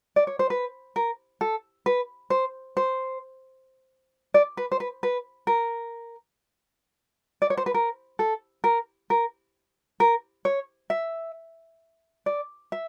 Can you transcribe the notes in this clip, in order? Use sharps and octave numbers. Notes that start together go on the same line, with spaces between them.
D5
C#5
C5
B4
A#4
A4
B4
C5
C5
D5
B4
C5
B4
B4
A#4
D5
C#5
C5
B4
A#4
A4
A#4
A#4
A#4
C#5
E5
D5
E5